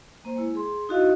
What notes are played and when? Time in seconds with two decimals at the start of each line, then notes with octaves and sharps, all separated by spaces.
0.24 G#3 A#3 C5
0.36 G#3 E4
0.55 G#4 C6
0.89 D#4 E4 F#4 D#5 F5